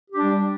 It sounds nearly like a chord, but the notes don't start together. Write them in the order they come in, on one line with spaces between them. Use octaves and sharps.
G4 D4 G3